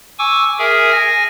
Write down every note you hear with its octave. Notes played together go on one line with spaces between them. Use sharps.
G#5 C#6 D6 E6
G#4 A#4 E5 G#5
G#5 A#6